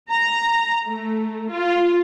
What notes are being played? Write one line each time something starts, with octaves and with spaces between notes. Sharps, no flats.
A#5
A3
F4